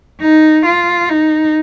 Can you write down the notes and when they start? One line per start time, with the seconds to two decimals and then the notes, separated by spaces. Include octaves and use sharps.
0.21 D#4
0.66 F4
1.09 D#4